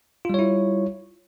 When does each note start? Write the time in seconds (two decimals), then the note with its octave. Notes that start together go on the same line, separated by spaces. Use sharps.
0.25 F4
0.30 G3
0.34 C#5
0.39 E4